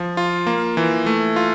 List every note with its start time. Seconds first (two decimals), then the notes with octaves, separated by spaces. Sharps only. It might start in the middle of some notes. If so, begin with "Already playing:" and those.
Already playing: F3
0.17 F4
0.47 A#3
0.77 E3
1.06 A3
1.36 F4